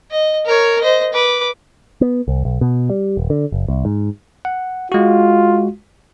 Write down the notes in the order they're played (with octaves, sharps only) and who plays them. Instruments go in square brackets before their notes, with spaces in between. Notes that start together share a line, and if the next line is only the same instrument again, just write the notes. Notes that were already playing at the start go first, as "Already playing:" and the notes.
[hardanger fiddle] D#5
A#4 C#5
C5 D#5
B4 D6
[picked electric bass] B3
C2
B1
B2
G3
D#1
D3
F#1
C2
G#2
[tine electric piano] F#5
[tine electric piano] G#3 F#4 [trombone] F4